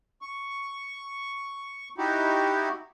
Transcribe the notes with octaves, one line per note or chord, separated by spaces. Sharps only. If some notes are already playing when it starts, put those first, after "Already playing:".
C#6
D#4 E4 F#4 G4